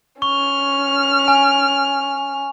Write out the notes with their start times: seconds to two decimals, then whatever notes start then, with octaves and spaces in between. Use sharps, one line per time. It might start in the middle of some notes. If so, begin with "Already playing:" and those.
0.22 C#4 C#6 F6
1.28 G#5